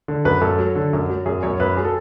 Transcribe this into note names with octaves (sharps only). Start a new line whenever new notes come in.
D3
F#2 B4
F#2 A4
F#3
D3
F#2
F#3
F#2 G#4
F#2 C#5
F#2 B4
F#3 G#4
A4